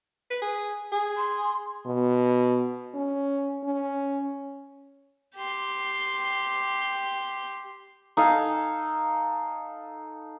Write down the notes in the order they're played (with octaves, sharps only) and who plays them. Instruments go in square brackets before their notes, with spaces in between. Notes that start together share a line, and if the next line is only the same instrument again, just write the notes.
[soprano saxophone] B4
G#4
G#4
[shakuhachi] C6
[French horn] B2
C#4
C#4
[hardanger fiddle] G4 C6
[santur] D#4 A4 F5 G#5